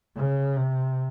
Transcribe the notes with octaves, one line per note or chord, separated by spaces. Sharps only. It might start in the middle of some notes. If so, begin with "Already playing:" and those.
C#3
C3